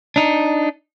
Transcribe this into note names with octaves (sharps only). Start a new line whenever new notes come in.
D4 D#4